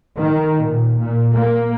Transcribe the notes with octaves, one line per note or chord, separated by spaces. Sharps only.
D#3
A#2
A#2
A#3